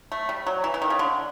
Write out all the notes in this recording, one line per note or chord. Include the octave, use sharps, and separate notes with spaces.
A3
G3
F#3
E3
E3
D#3
C#3
D3